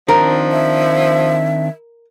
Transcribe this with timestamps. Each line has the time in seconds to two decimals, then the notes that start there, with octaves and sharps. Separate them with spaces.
0.09 D#3 F3 C4 D4 A#4
0.51 E5